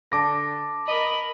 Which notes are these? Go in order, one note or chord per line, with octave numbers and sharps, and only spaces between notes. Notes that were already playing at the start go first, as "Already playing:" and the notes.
D3 A5 D6 A#6
A#4 D#5 B5